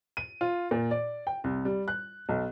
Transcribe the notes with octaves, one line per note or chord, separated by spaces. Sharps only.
D#7
F4
A#2
D5
G5
C2
G3
F#6
B1